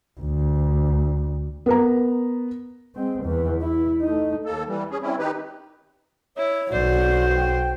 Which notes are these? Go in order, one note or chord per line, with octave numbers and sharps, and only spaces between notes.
D2
B3 A#4 A#5
G#3 C4
E2 E3
E4
A3 D#4
D#2 A#3 A4
E3 G3
C#4 G#4
G3 C4 C#4 E4
D#3 D#4 G4 B4
E4 C#5
B1 F#4 C5 D5
G5